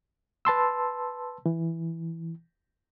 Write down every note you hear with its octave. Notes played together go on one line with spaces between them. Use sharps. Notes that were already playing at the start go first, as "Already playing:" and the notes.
B4 A5 C6 E6
E3